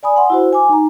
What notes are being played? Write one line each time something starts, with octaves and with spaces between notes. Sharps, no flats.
D5 G#5 B5 D#6
F#5 C6
E4 F#4 C5
G#5 D6
D#4 A#5